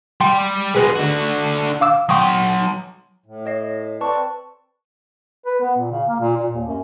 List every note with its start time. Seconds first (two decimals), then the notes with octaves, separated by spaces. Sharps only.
0.21 G3 G5 C6
0.75 B2 G#3 G#4 B4
0.96 D3 F#4
1.81 F5 D6 E6
2.09 F#3 G5 C6 C#6 D#6
3.26 A2
3.46 C#5 D#5 C7
4.01 C4 A4 B4 D5 A5 C#6
5.46 B4
5.62 B3
5.77 A#2
5.91 C#3
6.09 A#3
6.20 A#2
6.37 A#2
6.55 D#2
6.67 F#2